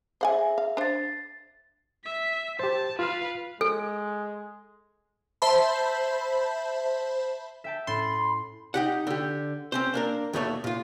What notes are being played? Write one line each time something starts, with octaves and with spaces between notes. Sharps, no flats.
G#4 C5 E5 F#5 G#5
F5
D4 C5 A6 C7
E5 B6
G4 C5 A5
F4 B4 F5 F6
G#3 A4
C5 E5 A5 B5
E5 G5 A5
A2 C#4 B5 C6 A6
D#4 G4 F#5
D3 G4
C4 C#4 C5
A#3 D4 A#4
D#2 B2 A3 C#5
A#2 F4